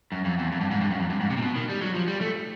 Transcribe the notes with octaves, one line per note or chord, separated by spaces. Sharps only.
F#2
F2
E2
F2
G2
G#2
G2
F#2
F2
G2
G#2
C3
A#2
B2
D#3
G3
F#3
F3
G3
A3